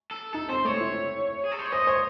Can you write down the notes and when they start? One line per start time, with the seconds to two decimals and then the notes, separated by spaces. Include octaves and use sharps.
0.11 A4
0.33 D#4 A4
0.49 C4 C5
0.65 A3 C#5
0.80 E4
1.44 G#4
1.52 A4
1.59 C5
1.65 C#5
1.72 C5 D#5
1.87 C5 C#5